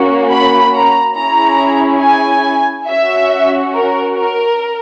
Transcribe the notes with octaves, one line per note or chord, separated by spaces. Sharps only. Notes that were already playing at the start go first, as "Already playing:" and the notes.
Already playing: A#3 C#4 F#4
B5
A#5
C#4 E4 G#4 A#5
G#5
C#4 F#4 E5
A#4
A#4